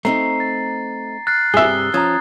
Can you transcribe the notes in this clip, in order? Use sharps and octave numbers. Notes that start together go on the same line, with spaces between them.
A3 C4 D#4 A#5 C7
A6
F6 F#6 A6 C7
G2 C3 G#4 E5 D#6 G7
F3 C#4 A#5 D#6 G#6